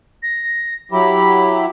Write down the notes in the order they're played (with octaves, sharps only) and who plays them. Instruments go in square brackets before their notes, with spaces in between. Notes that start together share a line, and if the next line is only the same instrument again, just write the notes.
[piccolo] A#6
[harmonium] F#3 E4 G4 [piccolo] B5